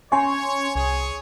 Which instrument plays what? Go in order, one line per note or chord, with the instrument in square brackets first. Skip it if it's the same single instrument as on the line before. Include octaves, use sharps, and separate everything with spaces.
[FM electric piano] C#4 C6 C#6 [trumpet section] C#5 [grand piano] G#5
[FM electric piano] C2 [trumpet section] G#4 C#5